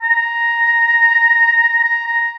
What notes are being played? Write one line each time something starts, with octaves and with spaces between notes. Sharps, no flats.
A#5
A#5
A#5